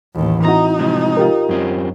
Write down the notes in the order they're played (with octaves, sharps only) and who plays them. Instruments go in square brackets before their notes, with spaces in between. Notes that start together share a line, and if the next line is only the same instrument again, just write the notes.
[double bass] A1 D#2
[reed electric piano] C4 E4 F#4 [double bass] D#4 [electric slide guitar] A#5
[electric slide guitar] C3 F3 G#3
[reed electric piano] F4 G4 A#4
[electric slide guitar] F#2 C4 C#4